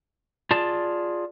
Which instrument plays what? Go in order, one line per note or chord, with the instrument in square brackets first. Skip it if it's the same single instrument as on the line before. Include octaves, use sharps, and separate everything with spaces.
[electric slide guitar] F4 G#4 D5 A5